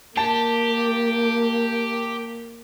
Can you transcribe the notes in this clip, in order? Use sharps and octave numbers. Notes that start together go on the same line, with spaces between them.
A#3 G4 A5